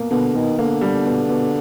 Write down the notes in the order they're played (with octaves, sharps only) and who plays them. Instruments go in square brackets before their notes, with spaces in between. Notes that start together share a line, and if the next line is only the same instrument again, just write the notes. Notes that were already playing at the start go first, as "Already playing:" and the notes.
Already playing: [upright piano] B2 A#3
[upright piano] B2 [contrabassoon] D3
[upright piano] B2 [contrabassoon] D#3
[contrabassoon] D3 [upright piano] A#3
[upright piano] G3
B2
B2